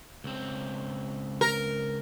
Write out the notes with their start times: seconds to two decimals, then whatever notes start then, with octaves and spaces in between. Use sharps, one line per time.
0.24 C#2 C4
1.41 A#4